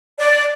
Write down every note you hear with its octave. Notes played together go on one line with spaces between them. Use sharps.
D5